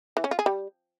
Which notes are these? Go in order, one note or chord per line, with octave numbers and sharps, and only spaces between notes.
E3
C#4
F4
G#4
G3